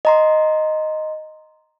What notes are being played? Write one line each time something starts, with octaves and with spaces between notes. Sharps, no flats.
D#5 A#5 C6